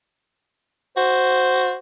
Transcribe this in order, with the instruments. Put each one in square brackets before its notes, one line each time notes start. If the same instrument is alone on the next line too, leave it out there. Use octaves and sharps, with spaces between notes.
[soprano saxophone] F#4 [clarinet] C5